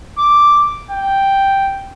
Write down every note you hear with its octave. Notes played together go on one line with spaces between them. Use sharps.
D6
G5